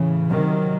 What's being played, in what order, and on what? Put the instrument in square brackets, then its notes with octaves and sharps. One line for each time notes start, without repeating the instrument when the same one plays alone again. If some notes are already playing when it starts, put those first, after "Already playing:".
Already playing: [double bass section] A2 C#3 [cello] E3
[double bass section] C3 D#3 [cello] F#3